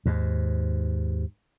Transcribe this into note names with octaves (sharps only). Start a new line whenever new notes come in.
D#2 G#2